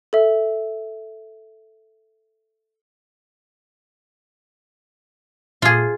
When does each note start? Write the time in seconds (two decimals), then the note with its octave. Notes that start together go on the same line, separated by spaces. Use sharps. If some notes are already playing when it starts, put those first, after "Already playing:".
0.13 A4 E5
5.62 A#2 F4 G#4